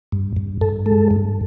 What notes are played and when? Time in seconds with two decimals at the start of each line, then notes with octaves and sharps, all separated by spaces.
0.12 G2
0.37 G2
0.61 G2 A4
0.86 G#3 A4
1.11 G2